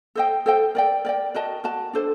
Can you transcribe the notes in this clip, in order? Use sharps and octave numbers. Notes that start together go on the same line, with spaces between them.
A4 C5 D#5 G5
A4 C5 D#5 G5
A#4 D5 G5
A#4 D5 G5
F#4 A#4 D#5 A5
F#4 A#4 D#5 A5
D4 A4 C5